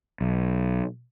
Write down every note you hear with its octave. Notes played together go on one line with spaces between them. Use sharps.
B1